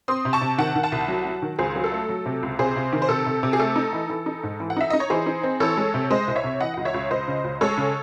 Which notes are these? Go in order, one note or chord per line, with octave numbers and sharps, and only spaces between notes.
C4 C6 D#6
C3
A5 C#6
C3
D#3 F#5 A5
D#3
F#5 A5
C2
F#3
F#3
D#3
C#2 G#4 C5
F#3 G#4
A4
A3
F#3
C3
C#2
C3 G#4 C5
C3
D#3
C5
C3 A4
C3
C3
G#4
A3 A4
D#4
E3
E3
D#4
G#2
E3
F#5
D#4 E5
D#4 D#5
C#5
E3 G#4 C5
D#4
C4
E3 A4 C#5
G#3
C3
G#3 C5 D#5
C2
C#5 E5
C3
E3 D#5 F#5
C#2 F#5
C#5 E5
C#2
C#2 C5 D#5
C#3
C#2
G#3 A4 C#5
C#3